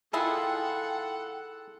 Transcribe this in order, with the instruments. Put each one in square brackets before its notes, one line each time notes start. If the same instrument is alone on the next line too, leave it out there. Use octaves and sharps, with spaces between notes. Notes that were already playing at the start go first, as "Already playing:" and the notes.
[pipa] D#3 E4 F4 [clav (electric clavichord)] G#4 [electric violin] A4 F#5 [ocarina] G5